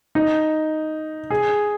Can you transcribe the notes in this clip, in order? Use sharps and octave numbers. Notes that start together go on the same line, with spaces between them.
D#4
G#4